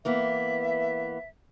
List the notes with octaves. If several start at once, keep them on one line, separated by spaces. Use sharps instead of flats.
E3 A#3 B3 E5